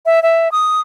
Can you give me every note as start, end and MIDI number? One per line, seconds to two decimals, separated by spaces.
0.06 0.22 76
0.23 0.51 76
0.52 0.81 87